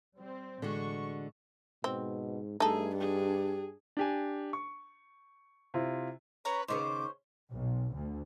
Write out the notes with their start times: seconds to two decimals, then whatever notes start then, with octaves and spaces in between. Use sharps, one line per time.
0.18 G3 C4
0.62 A1 D3 G#3 F#4 C#6
1.84 G#2 B2 C4
2.60 G2 A3 D#4 G#4 A4
2.96 D4 G4 G#4
3.97 D4 G4 G#5
4.53 C#6
5.74 C3 E4 F4
6.45 C#4 B4 C#5 A#5
6.68 D#2 C#3 B3 C#4 C5 D6
7.53 B1
7.95 D2